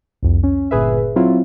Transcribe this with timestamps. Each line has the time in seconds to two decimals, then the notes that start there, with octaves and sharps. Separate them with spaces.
0.23 C2 F2
0.43 C#4
0.71 G1 A#2 G#4 B4 E5
1.16 F#3 C4 E4 F4